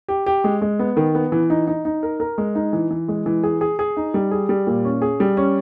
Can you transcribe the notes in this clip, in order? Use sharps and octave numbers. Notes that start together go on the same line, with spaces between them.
G4
G4
G#3
G#3
B3
D#3
B3
E3
D#4
D#4
D#4
A#4
A#4
G#3
D#4
E3
E3
G#3
E3
G#4
G#4
G#4
D#4
G3
G#4
G3
A#2
C#4
G#4
G3
C#4